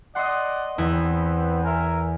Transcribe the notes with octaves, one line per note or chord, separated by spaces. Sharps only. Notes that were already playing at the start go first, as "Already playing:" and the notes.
D5 D#5 F#5 C6
E2 B3 C4 E4 B4 A#5
A#4 E5 G#5